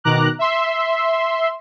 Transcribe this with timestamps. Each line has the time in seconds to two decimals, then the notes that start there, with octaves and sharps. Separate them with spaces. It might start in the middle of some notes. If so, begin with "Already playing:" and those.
0.04 B2 D#3 A#5 D6 F#6
0.39 E5 C6